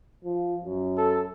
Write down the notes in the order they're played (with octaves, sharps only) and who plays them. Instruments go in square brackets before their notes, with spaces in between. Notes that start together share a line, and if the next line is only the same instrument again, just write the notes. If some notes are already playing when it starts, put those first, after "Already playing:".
[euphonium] F3
F#2
[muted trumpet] A4